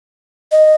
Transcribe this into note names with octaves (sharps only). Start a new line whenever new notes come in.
D#5